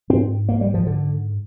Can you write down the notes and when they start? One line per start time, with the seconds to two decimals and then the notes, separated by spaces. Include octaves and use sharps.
0.10 G#2 C4
0.49 A#3
0.61 G3
0.74 F3
0.87 D3